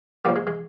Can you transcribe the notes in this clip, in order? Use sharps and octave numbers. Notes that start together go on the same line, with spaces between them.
A#2 F3 G3 A#3
G#3
G#3